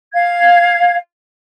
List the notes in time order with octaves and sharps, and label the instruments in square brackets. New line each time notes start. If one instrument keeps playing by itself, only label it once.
[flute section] F5 G#6